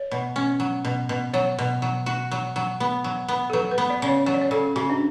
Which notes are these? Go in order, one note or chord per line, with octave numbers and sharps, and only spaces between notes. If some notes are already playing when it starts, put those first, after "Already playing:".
Already playing: C#5
B2
C#4
F#3
B2
B2
F#3 C#5
B2
F#3
F#4
F#3
F#3
B3
F#3
B3
A4
F#3 B4
B4
B3
D5
C#3
C#5
F#3 C#5
D5
C#5
C#3 A4
C#3 F#4
D4